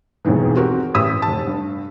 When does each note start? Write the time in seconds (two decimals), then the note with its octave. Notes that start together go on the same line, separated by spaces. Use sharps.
0.25 E1 B1 F2 G#2 D#3 E3
0.56 C4 F#4 G4 A#4
0.94 A1 G4 D#6 E6 B6
1.22 F1 A5
1.47 G2